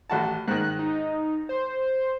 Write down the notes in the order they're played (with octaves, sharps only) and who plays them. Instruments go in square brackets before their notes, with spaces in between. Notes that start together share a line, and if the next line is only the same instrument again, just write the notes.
[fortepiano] A1 F#4 A5
[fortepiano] G#2 D#3 [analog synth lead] F#6
[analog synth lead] D#4
C5